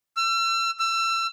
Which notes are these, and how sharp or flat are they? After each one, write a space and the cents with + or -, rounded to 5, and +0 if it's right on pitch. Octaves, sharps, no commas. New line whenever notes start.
E6 +40
E6 +30